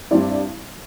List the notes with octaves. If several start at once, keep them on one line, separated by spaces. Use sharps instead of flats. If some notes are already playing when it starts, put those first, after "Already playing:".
G2 G3 C4 E4 D5